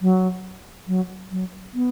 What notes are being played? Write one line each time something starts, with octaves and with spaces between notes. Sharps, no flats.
F#3
F#3
F#3
B3